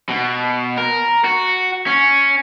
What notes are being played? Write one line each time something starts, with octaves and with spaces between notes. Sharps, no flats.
B2
A#4
F#4
C#4